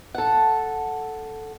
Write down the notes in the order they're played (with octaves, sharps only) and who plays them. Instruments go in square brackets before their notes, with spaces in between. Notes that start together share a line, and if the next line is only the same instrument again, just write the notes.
[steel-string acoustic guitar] A4 F#5